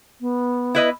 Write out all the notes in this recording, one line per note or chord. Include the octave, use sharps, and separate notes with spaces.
B3
E4 B4 D#5